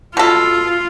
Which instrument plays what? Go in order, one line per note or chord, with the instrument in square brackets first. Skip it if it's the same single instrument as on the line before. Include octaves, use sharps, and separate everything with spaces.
[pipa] B2 A4 [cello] F4